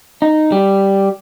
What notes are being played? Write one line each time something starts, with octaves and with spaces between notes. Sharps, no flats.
D#4
G3